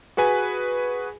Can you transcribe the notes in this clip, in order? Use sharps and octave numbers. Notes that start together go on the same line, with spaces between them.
F#4 G#4 B4 G#5